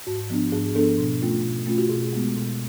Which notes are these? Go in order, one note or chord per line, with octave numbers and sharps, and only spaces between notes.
G#2 F#4
F3 B3 D4
G#2 G#4
F3 B3 D4 A4
B2
A3 C#4 F4
B2
A3 C#4 F4
F#4
B2 G#4
G#3 B3
B2